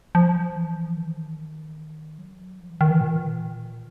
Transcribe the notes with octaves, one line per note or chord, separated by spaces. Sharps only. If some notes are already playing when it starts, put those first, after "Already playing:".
F3
E3
D#3
F#3
F3
E3
D#3
E3
A#2